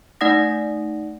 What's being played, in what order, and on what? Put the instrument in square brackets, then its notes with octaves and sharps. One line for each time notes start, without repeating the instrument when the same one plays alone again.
[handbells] A3 D#4 D5 F#5 D#6 A#6